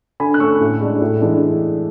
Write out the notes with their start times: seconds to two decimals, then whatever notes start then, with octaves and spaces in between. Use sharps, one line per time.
0.20 D3 G#5 B5
0.34 F#6
0.40 A3 C#4 C#6 E6
0.60 A2
0.81 G#3 D4
1.01 A2
1.21 E3 G#3 D4